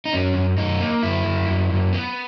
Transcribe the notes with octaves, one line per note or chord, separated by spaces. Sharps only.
D#4
F#2 C#4
F#2
F#2 D#4
A#3
F#2 E4
F#2
F#2
F#2
B3